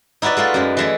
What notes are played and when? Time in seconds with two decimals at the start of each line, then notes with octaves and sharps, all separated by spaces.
0.22 D#4 E4 F#4 B4 D5
0.37 G#3 A3 F4 A4
0.54 F#2 G#3
0.77 E3 G#3 A3